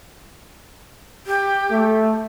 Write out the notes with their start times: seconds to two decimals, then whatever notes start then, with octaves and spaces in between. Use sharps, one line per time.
1.26 G4
1.71 A3